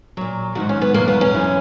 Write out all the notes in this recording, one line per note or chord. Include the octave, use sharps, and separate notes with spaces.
A#2 F#3
G#2 D#3 F#3 F#4
C#4
B3
E2 B2 F#3 A#3
B3
C#4
F#2 E3